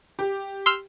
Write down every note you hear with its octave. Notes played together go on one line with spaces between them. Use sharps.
G4
C6 E6 F6